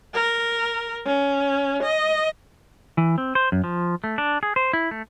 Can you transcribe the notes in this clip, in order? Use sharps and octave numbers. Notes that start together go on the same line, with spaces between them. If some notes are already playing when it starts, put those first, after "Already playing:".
A#4
C#4
D#5
E3
C4
C5
F#2
F3
A3
D4
G#4
C5
E4
A3